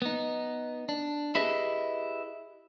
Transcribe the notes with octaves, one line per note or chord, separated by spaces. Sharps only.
B3 D#4
D4
E4 G4 G#4 B4 D#5